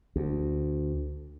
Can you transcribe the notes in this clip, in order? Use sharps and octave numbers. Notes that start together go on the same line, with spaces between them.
D2